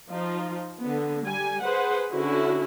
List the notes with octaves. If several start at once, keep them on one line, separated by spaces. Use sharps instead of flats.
F3 D#4 F4
D3 B3
G3 G#5
G#4 B4 C5 F#5
D3 C#4 E4 F#4